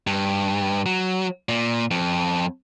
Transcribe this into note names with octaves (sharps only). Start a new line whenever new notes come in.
G2
F#3
A#2
F2